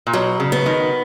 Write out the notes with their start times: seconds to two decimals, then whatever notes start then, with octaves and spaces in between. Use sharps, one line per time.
0.07 A#2
0.13 B2 F#3
0.40 C#3
0.52 B3
0.66 D#3